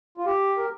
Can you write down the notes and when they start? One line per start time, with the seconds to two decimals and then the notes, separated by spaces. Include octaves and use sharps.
0.17 F4
0.26 G4
0.57 A#4